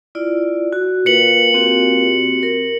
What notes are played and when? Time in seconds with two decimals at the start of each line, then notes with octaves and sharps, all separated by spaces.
0.15 E4 F4 D5
0.73 F#4
1.06 A#2 B4 C#7 F#7
1.54 C4 F#4 G4
2.43 A#4